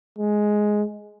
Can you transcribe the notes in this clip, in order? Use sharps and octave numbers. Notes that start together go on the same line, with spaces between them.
G#3